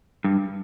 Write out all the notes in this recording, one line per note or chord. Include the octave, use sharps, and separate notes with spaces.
G2